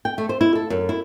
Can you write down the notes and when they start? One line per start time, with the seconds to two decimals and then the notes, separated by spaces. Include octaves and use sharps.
0.05 G5
0.18 A3
0.29 C5
0.41 E4
0.55 A4
0.70 F#2
0.89 E4